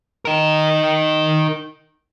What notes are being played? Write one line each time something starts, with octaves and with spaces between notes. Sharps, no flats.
D#4 A#4